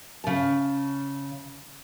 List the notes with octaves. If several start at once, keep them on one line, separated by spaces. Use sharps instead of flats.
C#3 A5